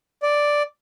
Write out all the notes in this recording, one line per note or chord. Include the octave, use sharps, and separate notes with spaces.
D5